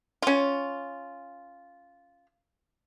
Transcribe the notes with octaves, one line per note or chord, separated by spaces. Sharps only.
C#4 F4